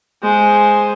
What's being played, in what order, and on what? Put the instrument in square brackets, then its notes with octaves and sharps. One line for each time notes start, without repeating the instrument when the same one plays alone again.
[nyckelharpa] G#3 C5